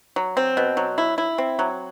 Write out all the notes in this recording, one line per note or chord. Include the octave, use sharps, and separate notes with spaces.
F#3
C4
B2
F#3
E4
E4
C4
F#3